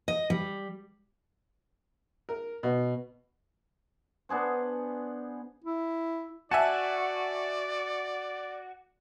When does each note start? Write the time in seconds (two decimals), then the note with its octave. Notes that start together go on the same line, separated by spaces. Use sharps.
0.08 D#5
0.30 G3
2.29 A#4
2.63 B2
4.29 B3 D4 G#4 C5
5.64 E4
6.51 F#4 D5 E5 G#5 A5